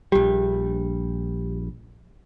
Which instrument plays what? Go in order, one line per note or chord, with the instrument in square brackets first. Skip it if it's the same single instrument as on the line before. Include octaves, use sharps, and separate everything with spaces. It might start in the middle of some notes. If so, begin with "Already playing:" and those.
[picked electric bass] A#1 G3 [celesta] G4